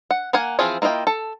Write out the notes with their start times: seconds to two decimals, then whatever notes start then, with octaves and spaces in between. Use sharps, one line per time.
0.11 F#5
0.33 A#3 F5 F#5 G#5
0.59 E3 F3 C4 F4 G#4
0.82 A#3 E4 F4 D#5 G5
1.07 A4